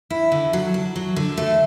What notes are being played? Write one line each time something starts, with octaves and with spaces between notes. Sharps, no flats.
E4
D3
F#3
D4
F#3
D3
A3